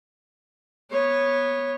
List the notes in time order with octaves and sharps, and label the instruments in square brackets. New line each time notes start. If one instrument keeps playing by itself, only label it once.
[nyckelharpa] B3 C#5